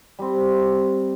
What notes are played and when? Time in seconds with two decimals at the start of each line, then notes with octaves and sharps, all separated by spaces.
0.19 G3 C4